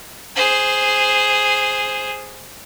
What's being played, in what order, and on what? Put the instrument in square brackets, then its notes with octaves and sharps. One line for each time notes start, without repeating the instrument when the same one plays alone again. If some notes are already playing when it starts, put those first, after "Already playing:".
[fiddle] G#4 C5